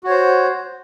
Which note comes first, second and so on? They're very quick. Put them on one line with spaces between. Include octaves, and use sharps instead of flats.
F#4 C#5 C5